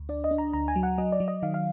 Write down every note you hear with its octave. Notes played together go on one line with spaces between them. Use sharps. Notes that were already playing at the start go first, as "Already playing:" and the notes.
Already playing: D2
D4 D5
D#5
D4
A#5
D2 A#5
G#5
F#3
F#5
F#3 D#5
D5
F#3
D#5
D#3 F5
F5